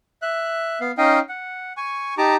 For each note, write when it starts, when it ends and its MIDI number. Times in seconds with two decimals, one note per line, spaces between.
0.22 0.79 76
0.22 0.79 90
0.81 0.91 59
0.81 0.91 77
0.98 1.19 61
0.98 1.19 63
0.98 1.19 75
0.98 1.19 77
0.98 1.19 79
1.29 1.73 78
1.77 2.14 80
1.77 2.14 85
2.18 2.36 63
2.18 2.36 67
2.18 2.36 81
2.18 2.36 82
2.18 2.36 86